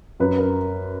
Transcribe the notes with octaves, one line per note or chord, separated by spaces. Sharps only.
F#2 B4
A#4